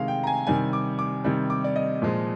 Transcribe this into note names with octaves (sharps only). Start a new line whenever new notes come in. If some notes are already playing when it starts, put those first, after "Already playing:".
Already playing: C3 D#3 G#3 F5
G5
A#5
G#5
C3 D#3 G3 G#5
D6
D6
C3 D#3 G3
D6
D5
D#5
A#2 F3 G#3